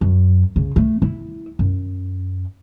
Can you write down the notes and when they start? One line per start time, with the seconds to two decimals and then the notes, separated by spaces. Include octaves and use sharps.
0.01 F#2
0.56 C#3
0.76 A3
1.02 E4
1.59 F#2